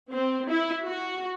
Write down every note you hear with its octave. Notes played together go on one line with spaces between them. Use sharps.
C4
E4
F#4